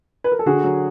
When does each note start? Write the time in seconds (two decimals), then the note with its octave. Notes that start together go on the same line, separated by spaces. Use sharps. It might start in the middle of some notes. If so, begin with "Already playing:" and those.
0.24 B4
0.32 A#4
0.39 A4
0.46 D3 F#4 G#4
0.64 F#3